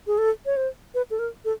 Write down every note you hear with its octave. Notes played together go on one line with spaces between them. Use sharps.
G#4
A4
C#5
C5
B4
A4
A#4
A4